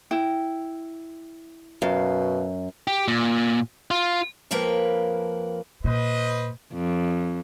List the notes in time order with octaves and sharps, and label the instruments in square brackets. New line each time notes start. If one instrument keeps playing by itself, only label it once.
[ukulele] E4 G5
[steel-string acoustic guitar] F#2 [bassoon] B2 [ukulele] F5
[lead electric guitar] G4
A#2
F4
[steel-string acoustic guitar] F2 F3 A#3 A#4 B4 G5
[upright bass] A#2 [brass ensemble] B4 C5 D#5
[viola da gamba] F2